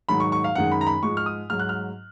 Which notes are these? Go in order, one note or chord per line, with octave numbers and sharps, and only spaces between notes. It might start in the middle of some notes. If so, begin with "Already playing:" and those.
G#2 D#3 F#3 B5
C#6
C#6
F5
F#2 D#3 G#3 F#5
B5
A#5
B5
G#2 F3 G#3 C#6
F6
D#6
G#2 F#3 F6
F#6
F6